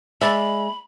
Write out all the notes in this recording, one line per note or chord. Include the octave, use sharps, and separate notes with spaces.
G#3 D5 E5 B5